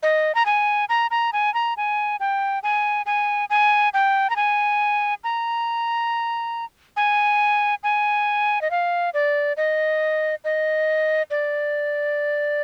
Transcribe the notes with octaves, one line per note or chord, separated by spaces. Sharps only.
D#5
A#5
G#5
A#5
A#5
G#5
A#5
G#5
G5
G#5
G#5
G#5
G5
A#5
G#5
A#5
G#5
G#5
D#5
F5
D5
D#5
D#5
D5